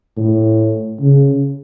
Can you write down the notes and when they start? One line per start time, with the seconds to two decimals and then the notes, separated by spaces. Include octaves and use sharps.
0.17 A2
1.01 C#3